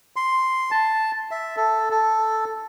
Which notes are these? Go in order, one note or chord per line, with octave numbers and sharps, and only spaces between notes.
C6
A5
E5
A4
A4